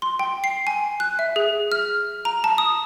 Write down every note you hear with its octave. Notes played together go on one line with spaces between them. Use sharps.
C6
G5
C7
G#5
F#6
E5
G#4
F6
A#5
A5
D#6